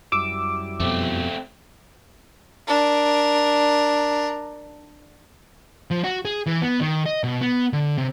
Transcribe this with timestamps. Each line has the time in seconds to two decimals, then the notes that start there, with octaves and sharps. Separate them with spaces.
0.12 F#2 G3 E4 D6 E6
0.80 F2 B2 A3 C4
2.68 D4 A#4
5.91 F3
6.04 F#4
6.25 G#4
6.46 E3
6.62 B3
6.81 D#3
7.06 D#5
7.24 B2
7.41 B3
7.73 D3
7.98 C3